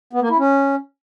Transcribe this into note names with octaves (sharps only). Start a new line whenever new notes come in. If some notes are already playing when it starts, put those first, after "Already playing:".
B3
A#3
E4
C#4